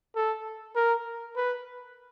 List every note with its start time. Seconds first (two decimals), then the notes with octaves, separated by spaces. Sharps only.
0.16 A4
0.76 A#4
1.36 B4